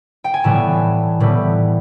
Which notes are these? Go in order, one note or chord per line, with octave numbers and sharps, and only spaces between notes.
G5
G#5
A2 E3 G3 B3 A5
A2 E3 G3 B3